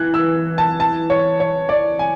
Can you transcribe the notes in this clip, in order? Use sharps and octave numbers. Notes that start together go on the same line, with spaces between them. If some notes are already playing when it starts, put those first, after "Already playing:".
Already playing: E3 F#6
E6
A5
A5
C#5
C#5
D5
G#5